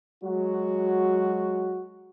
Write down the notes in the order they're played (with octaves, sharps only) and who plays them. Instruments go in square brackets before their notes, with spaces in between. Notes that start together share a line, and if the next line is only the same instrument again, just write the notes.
[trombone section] F#3 G#3 F#4